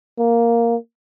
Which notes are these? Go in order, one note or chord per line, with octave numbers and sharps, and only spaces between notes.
A#3